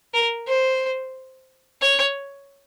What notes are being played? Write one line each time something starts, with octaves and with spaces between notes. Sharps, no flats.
A#4
C5
C#5